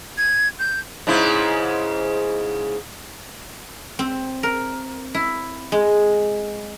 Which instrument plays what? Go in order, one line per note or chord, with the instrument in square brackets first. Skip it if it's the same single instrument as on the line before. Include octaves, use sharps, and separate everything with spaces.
[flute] G#6
G6
[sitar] G#2 C#3 E4
[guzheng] C4
A#4
E4
G#3